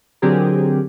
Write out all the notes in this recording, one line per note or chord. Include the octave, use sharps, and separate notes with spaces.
D3 F#3 C4 G4 G#4 A#4